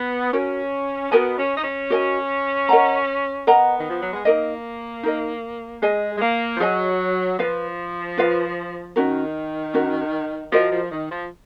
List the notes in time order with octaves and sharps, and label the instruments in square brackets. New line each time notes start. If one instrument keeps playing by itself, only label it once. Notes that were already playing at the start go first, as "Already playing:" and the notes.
Already playing: [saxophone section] B3
[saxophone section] C#4 [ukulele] F#4 A#4 C#5
[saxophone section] B3 [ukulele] F#4 A#4 D#5 G#5
[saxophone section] C#4
D#4
C#4
[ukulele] F#4 A#4 D#5 G#5
A#4 D#5 F#5 A#5
[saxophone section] B3 [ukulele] A#4 D#5 F#5 A#5
[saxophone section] D#3
F3
F#3
G#3
[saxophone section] A#3 [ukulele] D#4 A#4 D#5
[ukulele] D#4 A#4 D#5
[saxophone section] G#3 [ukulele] G#4 D#5 G#5
[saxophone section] G#3
A#3
F3
[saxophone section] F#3 [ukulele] G#4 D#5 G#5
[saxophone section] F3 [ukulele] F4 B4 F5
[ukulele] F4 B4 F5
[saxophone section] D#3 [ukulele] C#4 F#4 A#4
[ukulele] C#4 F#4 A#4
[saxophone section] F3 [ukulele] F#4 A#4 D#5
[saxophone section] F3
D#3
F3